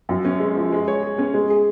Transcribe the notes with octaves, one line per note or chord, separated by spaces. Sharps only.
F#2
C#4
G#3
F3
G#3
C#5
G#4
C#4
G#3
G#4